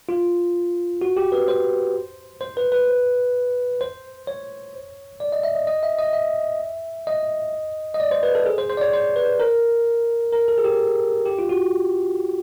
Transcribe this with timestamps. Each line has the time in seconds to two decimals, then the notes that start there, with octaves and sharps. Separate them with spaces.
0.09 F4
1.02 F#4
1.17 G4
1.32 B4
1.48 C5
2.41 C5
2.57 B4
2.72 B4
3.81 C5
4.27 C#5
5.20 D5
5.32 D#5
5.43 E5
5.55 D#5
5.67 D#5
5.83 E5
5.99 D#5
6.13 E5
7.07 D#5
7.94 D#5
8.00 D5
8.11 C5
8.23 B4
8.35 A4
8.46 G#4
8.58 C5
8.70 C5
8.77 D5
8.81 C#5
8.93 C5
9.16 B4
9.40 A#4
10.33 A#4
10.48 A4
10.58 G#4
10.64 G4
11.26 G4
11.39 F4
11.49 F#4